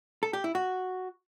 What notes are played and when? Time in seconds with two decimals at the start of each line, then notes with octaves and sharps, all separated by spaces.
0.23 A4
0.33 G4
0.44 E4
0.55 F#4